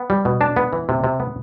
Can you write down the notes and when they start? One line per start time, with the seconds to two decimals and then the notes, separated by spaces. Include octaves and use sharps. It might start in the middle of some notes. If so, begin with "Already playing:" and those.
Already playing: B3
0.10 G3
0.25 B2
0.41 D4 A5
0.56 B3
0.73 E3
0.89 C3
1.04 C3
1.20 B3